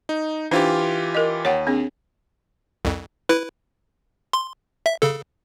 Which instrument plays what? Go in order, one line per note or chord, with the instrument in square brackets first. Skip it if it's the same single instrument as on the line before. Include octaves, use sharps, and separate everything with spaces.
[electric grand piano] D#4
[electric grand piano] E3 F4 G4 [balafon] D4 D#4 C5
[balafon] A#4 D#5
[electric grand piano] D#2 [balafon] C#5 F#5 G5
[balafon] C4 D4 G#4
[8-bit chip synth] C2 F2
E4 B4
C6
E5
C#3 A4